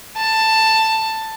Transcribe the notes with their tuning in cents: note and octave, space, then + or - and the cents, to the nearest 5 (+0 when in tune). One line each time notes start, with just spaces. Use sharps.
A5 +10